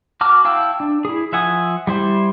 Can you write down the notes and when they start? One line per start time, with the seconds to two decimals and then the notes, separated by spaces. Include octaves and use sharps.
0.21 F#4 A5 D6 F6
0.45 E4 F5 G5 A5 E6
0.80 D4
1.05 E4 G#4
1.32 F3 E5 F#5 G#5 D#6
1.87 G3 E4 C5